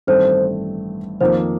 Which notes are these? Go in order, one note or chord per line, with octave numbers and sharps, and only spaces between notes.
A1 G2 D#3 A3 C4 C5
F2 D#3 A#3 C5